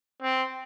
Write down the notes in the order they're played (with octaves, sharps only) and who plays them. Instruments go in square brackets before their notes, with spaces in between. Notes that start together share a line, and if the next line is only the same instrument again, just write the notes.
[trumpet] C4